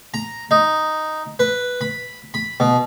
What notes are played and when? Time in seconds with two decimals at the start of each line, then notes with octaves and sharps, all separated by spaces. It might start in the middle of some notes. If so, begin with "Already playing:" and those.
0.14 A#5
0.51 D#4
1.39 B4
1.81 B5
2.34 B5
2.60 B2